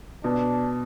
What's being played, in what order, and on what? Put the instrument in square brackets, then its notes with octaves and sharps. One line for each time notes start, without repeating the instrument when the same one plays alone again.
[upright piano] B2 [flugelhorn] D4